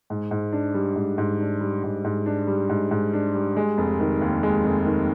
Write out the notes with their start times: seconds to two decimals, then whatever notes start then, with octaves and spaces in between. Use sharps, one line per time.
0.10 G#2
0.31 G#2
0.53 D4
0.74 G3
0.96 G#2
1.18 G#2
1.40 D4
1.61 G3
1.83 G#2
2.05 G#2
2.26 D4
2.47 G3
2.69 G#2
2.91 G#2
3.13 D4
3.34 G3
3.57 G#3
3.78 F1
4.00 D#3
4.22 D#2
4.43 G#3
4.64 F1
4.86 D#3